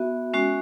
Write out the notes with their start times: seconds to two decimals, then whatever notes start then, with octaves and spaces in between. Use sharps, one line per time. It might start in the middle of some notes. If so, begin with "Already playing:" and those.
Already playing: B3 F#4 E5
0.34 G#3 C#4 F#4